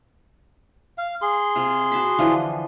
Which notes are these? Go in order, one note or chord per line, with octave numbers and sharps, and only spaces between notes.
F5
G#4 C6
C3 F4
F#4 A5 B5
D3 E3 F3